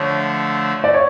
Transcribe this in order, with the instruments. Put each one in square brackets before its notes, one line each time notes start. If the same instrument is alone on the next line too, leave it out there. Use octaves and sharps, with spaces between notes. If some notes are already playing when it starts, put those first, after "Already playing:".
Already playing: [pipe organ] D3 F3 A3 [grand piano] C#5
[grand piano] D5
C#5